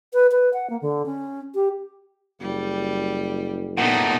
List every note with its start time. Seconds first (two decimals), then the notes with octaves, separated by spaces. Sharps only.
0.13 B4
0.31 B4
0.53 F#5
0.70 A#3
0.82 D3
1.06 C#4
1.55 G4
2.41 F#1 G3
3.77 A#2 A3 B3 D#4 F#5